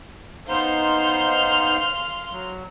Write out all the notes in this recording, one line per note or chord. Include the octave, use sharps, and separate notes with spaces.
B3 D#4 C5 F5 C6 F6
F#3